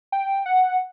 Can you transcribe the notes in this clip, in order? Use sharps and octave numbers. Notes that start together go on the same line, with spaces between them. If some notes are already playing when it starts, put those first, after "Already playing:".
G5
F#5